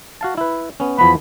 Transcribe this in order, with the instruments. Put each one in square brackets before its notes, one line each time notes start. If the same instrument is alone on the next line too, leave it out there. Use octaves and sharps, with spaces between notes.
[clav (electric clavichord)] F#4 F5 A5
E4 B4
B3 C#4
[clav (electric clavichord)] E2 F3 B3 [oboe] B5